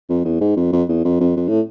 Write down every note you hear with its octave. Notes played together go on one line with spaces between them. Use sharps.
F2
E2
G#2
F2
F2
E2
F2
F2
F2
A2